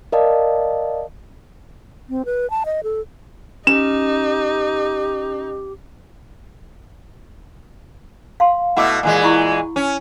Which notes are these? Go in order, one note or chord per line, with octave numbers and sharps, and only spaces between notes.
A#4 D5 D#5 F5 A5
C4
B4
A5
D#5
A4
C#4 D#4 G4 E7
F5 C6
B2 A3 E4 F#5 D6 E6
A#2 E3 G#3
E4 B5 C#6
C#4